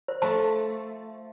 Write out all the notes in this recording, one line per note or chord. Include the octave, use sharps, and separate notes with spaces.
C5
F3 A3 C5 A5